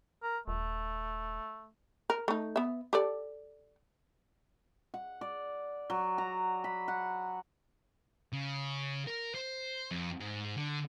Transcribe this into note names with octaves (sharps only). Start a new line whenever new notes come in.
A#4
D#1 A3
A#4
A3 D#4
B3 E5
G4 A4 D5
F#5
D5
F#3
A#5
B5
F#5
C#3
A#4
C5
F2
G#2
D3